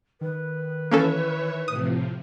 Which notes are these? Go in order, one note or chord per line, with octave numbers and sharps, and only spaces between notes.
D#3 B4
E3 A#3 C#4 A4 C#5 E5
A2 C3 F3 D#6